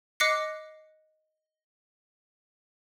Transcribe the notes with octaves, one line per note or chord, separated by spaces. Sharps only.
D#5 D6 F#6 A#6 C7 C#7